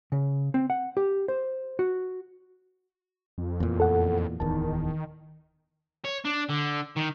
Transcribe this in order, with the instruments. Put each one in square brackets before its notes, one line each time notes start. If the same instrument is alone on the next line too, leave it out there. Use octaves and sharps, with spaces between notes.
[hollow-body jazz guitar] C#3
C4
F#5
G4
C5
F#4
[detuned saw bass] F2
[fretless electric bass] E2 A#2
[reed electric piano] A4 F#5
[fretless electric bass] D1 E2 [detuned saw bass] D#3 [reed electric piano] A5
[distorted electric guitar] C#5
D4
D3
D#3